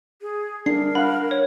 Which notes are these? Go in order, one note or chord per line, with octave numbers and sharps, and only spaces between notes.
G#4
D4 A#4 C7
F5 F#5 B5
C#5